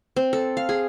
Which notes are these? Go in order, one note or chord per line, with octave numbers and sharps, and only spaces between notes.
C4
A4
F5
G#4